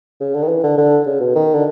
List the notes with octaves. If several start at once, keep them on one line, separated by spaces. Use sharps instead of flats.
C#3
D3
D#3
E3
D3
D3
C#3
B2
D#3
D3